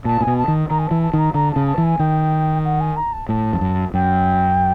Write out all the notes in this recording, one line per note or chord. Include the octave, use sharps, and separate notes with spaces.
A#2 A5
A#2 G#5
B2
A5
D#3
D#3 A#5
G#5
E3 A5
A5
D#3 A#5
D3 A#5
A5
C#3
A5
E3
G#5
D#3 G5
F#5
G#5
A#5
A5
A2 A5
F2
F#2
F#2 G5